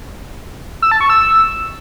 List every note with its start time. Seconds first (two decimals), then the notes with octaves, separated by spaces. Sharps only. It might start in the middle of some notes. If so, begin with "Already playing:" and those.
0.82 E6
0.91 A5
1.01 C#6
1.10 E6